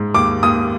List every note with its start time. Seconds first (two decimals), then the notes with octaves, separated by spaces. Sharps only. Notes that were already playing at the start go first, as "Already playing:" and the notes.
Already playing: G#2
0.14 D#2 D6
0.43 D#2 D#6